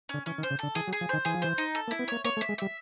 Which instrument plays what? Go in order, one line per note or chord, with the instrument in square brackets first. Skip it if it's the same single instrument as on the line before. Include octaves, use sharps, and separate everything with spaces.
[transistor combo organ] D3 [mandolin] C#4
[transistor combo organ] E3 [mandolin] C#4
[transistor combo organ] D#3
[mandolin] C5
[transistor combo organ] C#3
[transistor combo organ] D3 [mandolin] A4
[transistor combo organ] E3 [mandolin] G#4
[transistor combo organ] F#3
[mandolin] G#4
[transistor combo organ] F3
[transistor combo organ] D#3 [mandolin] C5
[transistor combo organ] E3 [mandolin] G#4
[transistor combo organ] F3
[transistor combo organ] E3 [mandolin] C5
[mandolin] D#4
A4
[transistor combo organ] A#3
[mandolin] E4
[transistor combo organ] B3
[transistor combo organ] A#3 [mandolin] C#5
[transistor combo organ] A#3 [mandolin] C#5
[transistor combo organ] A3
[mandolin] E5
[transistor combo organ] G#3
[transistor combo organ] G3 [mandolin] E5